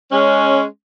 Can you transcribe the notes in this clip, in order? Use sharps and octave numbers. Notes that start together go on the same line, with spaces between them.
G#3 C#4